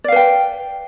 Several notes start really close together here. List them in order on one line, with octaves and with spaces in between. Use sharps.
D5 F5 B4 G5